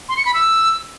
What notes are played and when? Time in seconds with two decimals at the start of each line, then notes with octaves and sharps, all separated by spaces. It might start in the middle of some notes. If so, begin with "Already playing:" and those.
0.09 C6
0.17 C#7
0.25 B5
0.34 E6